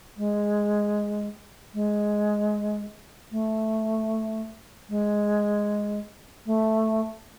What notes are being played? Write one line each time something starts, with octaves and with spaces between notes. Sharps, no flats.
G#3
G#3
A3
G#3
A3